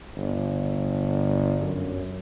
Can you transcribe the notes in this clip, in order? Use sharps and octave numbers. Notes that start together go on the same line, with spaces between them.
G1
F#2